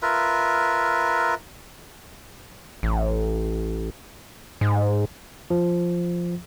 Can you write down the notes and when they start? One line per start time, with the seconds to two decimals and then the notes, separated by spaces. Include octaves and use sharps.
0.02 F4 A#4 B4 E5
2.83 A1
4.61 G#2
5.50 F3